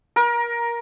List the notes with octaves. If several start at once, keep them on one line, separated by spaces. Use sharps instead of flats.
A#4